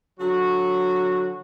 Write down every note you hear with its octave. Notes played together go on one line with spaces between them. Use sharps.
D3 F#3 F#4